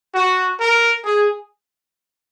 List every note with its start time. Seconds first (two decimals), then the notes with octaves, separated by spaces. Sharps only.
0.14 F#4
0.60 A#4
1.04 G#4